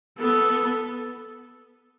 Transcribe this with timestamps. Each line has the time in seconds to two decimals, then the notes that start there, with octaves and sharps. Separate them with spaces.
0.20 B3 A4